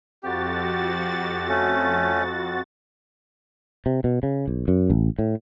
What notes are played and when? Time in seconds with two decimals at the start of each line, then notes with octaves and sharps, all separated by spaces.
0.23 F2 F#4 G4 A6
1.49 A3 C#4
3.86 C3
4.04 B2
4.23 C#3
4.48 B1
4.68 F#2
4.90 A1
5.19 A2